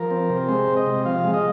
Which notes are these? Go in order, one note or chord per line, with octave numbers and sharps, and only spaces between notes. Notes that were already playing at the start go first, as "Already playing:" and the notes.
Already playing: F3 A#4
C4
C3
G#3 C5
C4
D#5
C3
F3 F5
G#3
D#5